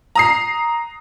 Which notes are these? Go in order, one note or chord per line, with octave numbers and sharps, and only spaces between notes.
A#5 D#6 C7